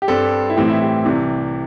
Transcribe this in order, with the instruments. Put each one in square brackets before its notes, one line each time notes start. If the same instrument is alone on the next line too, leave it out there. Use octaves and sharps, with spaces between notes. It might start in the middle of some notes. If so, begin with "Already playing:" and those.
[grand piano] G4
G2 G3 C4 A4
E4
A2 E3 C4 G4
E4
G4
C2 C3 E3